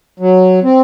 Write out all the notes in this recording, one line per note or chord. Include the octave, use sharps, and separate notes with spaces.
F#3
C4